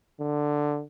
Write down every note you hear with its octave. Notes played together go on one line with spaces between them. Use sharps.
D3